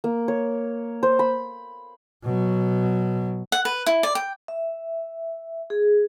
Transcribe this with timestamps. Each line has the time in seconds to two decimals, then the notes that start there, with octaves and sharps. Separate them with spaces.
0.04 A#3
0.28 C#5
1.03 C5
1.19 B5
2.24 B2 F#3
3.52 F#5
3.65 B4
3.86 E4
4.03 D5
4.15 G5
4.48 E5
5.70 G#4